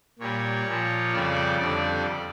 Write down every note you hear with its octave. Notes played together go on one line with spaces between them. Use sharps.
A#2 G3 C#5
A#2 F3
F2 C#3 G3 D5
F2 D3 G3 D5